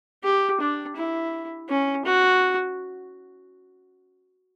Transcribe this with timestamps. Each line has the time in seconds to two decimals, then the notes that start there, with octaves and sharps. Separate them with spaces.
0.24 G4
0.61 D4
0.96 E4
1.69 C#4
2.05 F#4